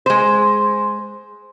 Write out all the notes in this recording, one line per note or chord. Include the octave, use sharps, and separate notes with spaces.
G#3 C5